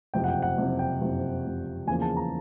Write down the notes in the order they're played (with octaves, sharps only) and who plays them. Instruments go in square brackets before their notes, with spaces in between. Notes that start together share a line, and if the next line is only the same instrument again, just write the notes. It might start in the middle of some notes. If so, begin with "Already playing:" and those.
[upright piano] F#1 F2 C3 G5
F#5
G5
F#5
F#1 F2 C3
G5
F#1 F2 C3
F#1 F2 C3
E2 C#3 F3 A#3 G#5
A5
A#5